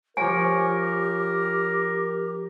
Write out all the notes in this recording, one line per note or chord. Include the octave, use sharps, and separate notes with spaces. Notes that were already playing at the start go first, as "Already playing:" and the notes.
F3 G4 A#4 C#5 G#5